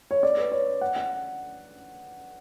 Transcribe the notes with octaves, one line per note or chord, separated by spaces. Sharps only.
C#5
D5
B4
C#5
F#5
F#5